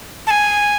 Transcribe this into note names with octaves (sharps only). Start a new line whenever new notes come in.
A5
G#5